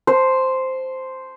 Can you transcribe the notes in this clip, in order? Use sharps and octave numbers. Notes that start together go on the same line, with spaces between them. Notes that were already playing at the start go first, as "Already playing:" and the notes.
C5